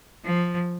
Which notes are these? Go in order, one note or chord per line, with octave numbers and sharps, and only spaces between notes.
F3